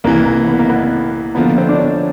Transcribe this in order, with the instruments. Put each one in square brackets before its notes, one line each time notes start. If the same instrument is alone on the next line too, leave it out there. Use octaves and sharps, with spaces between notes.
[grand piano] C2 C3 E3 [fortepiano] A#3
[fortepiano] A#3
B3
A#3
B3
[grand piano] D3 F3 A#3 [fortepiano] B3
[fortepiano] C4
D4
C#4